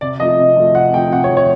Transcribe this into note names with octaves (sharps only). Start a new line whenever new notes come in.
C3 D5
F3 A3 D#5
C3
F3 A3
C3 F#5
F3 A3 G5
C3 F#5
C#5
F3 A3
C#5